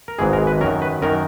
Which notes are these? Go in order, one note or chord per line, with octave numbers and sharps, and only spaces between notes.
A#4
G#1 G#2 E3 G#3 G#4
A#4
B4
F#2 D#3 F#3 A#4
B4
F#2 D#3 F#3 A#4